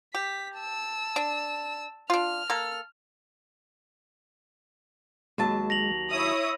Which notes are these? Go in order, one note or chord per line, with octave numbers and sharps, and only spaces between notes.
G4 B6
A5 E6
D4
D4 F4 F6
A#3 A4
D#2 F#3 G#3 A5
A#6 F7 F#7
E4 C#5 E5 D#6